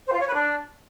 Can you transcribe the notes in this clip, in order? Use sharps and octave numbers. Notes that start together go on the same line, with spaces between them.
C5
F4
C#5
B4
D4